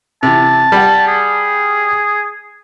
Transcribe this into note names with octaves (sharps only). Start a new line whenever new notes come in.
C3 E3 A5
G3 F#5
G#4